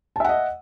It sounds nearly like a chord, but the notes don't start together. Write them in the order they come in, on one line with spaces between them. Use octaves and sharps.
A5 E5 F#5 D#5